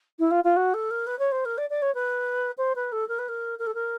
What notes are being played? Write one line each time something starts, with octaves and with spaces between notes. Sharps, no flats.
E4
F4
F4
F#4
A4
A#4
B4
C#5
C5
A#4
D5
D5
C#5
B4
C5
B4
A4
A#4
B4
A#4
A#4
A4
A#4